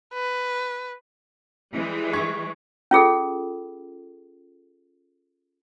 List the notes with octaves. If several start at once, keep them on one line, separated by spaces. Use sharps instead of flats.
B4
E3 G3 G#3
C#6 G#6 B6
C#4 F4 G#4 A4